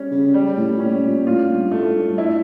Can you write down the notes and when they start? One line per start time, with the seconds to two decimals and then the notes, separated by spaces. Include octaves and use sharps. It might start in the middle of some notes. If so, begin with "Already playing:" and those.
Already playing: G3 C#4
0.11 C#3
0.34 G3
0.57 A2
0.70 A#2
0.80 A2 C#4
1.03 A#2
1.26 A2 F4
1.49 G2
1.71 A2 A3
1.95 G2
2.07 G2
2.18 E4